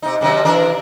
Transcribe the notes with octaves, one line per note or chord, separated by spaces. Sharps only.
C3 D#4
F#2 C3 D#3
E3 D4 A#4